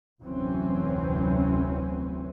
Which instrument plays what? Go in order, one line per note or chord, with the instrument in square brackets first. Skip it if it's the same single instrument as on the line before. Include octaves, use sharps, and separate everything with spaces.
[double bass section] F1 D2 E3 F#3 C4 C#4